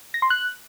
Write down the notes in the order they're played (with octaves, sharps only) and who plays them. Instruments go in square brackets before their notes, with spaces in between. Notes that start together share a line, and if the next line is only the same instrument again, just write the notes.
[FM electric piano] A#6
C6
F#6